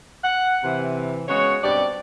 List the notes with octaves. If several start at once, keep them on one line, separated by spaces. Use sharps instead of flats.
F#5
C3 E3
C#3 G#3 B3 F#4 C#5
G2 B2 C4 G4 D5